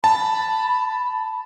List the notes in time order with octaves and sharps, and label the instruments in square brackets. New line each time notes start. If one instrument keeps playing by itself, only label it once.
[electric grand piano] A5 [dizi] B5